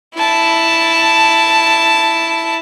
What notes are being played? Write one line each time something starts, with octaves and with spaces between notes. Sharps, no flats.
E4 A5